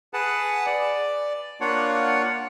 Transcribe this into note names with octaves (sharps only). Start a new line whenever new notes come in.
G#4 B4 F#5 A5
D5
A#3 D4 F4 C#5 F#5